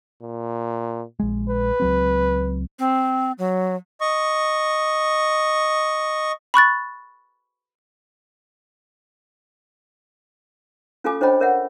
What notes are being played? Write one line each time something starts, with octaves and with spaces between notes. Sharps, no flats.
A#2
A#1 G#3
B4
C#2 F#3 C4
C4
F#3
D#5 C#6
B5 C#6 F#6 A6
C#4 F4 A4 F5 G#5 D6
D4 C5 C#5 D#5 G5 B5
A#4 C#5 E5 F#5